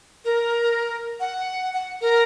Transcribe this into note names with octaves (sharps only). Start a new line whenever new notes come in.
A#4
F#5
F#5
A#4